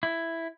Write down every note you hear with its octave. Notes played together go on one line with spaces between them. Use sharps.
E4